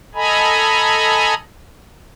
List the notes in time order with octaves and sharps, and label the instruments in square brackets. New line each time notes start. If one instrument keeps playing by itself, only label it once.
[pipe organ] A4 D#5 G#5 A#5 B5